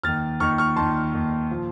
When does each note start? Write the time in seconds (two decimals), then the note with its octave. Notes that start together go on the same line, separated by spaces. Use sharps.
0.03 D#2 D#3 F6 A6
0.40 D#2 D#3 C#6 F6
0.58 C#6 F6
0.76 D#2 D#3 A5 C6
1.14 D#2 D#3
1.51 A#2 F3